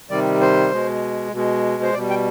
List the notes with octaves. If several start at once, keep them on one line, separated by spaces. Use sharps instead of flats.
C3 D#3 G3 D5
C5
B2 G#3
B2 G#3
C5
B2 G3 D5
G5